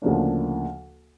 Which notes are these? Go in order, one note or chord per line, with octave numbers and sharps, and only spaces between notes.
D2 C#3 F3 A#3 D4